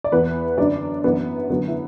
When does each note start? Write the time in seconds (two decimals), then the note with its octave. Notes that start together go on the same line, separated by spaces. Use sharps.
0.04 D5
0.12 E2 E3 B3 B4
0.58 F#2 D3 F#3 D4 D5
1.04 F#2 E3 B3 B4
1.50 F#2 D3 F#3 B3 B4
1.68 E4